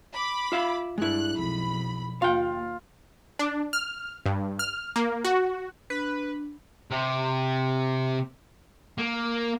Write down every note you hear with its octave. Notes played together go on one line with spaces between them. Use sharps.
B5 D6
F4 E5 F5
G2 G#3 E4 F#6
B1 F2 B5
D#2 F4 F5 G5
D4
F6
G2
F6
A#3
F#4
D4 B4
C3
A#3